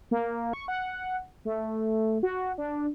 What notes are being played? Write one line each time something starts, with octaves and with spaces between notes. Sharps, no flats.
A#3
C#6
F#5
A3
F#4
D4